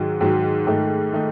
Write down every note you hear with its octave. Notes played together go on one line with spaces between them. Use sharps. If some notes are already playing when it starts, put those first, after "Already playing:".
Already playing: G#2 D#3 F#3
G#2 D#3 F#3
G#2 D#3 A3 D#4
D#3 A3 D#4